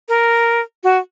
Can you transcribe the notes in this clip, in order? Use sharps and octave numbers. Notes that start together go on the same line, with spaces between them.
A#4
F#4